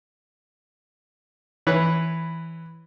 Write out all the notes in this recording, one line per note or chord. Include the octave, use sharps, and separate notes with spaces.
E3 B4 C#5